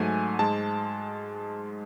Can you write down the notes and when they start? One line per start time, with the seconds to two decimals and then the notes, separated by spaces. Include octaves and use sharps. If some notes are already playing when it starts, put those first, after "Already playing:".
Already playing: G#2 F#3 A3 G#5
0.39 G#2 G#3 A5